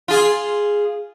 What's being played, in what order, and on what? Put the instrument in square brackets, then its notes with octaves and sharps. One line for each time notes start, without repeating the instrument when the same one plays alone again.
[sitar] F4 G#4